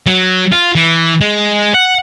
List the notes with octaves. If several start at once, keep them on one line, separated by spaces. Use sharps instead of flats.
F#3
F4
E3
G#3
F#5